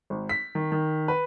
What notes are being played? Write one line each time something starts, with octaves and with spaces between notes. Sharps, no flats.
G#1
B6
D#3
D#3
B4